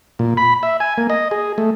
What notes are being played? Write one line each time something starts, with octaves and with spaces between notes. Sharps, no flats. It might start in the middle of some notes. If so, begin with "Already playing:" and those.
A#2
B5
E5
G#5
A#3
D#5
G#4
A3